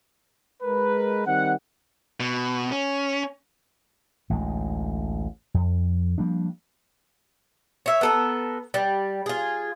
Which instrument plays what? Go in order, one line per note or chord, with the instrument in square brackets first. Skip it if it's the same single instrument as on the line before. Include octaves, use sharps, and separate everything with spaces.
[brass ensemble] G#3 A#4 B4
D#3 G3 C4 F#5
[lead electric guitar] B2
C#4
[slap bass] A1 D2 G#3
F2
F3 G3 A#3 D4
[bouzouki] C#5 E5
B3 A4 A#4
G3
F4 G#4